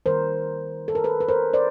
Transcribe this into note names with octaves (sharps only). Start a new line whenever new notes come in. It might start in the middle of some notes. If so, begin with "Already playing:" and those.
D#3 G3 A#3 A#4 C5
A4
A#4
A4 B4
B4
A#4 C5
C5 D5